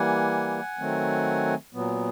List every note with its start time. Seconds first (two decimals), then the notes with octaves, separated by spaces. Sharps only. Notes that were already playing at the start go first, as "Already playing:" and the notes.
Already playing: E3 G3 A#3 F#5 G#5
0.79 D#3 F#3 A3 C4
1.74 A#2 F#3 B3